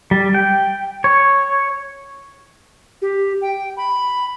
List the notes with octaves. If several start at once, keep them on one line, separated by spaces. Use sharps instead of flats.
G3
G5
C#5
G4
G5
B5